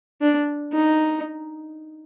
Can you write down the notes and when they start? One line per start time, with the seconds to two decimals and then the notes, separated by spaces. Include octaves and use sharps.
0.21 D4
0.73 D#4